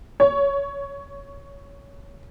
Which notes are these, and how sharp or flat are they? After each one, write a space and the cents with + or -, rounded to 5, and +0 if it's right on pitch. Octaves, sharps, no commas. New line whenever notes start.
C#5 +15